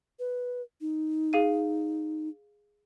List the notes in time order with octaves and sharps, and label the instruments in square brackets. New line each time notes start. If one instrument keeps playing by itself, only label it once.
[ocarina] B4
D#4
[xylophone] G#4 F5 D#7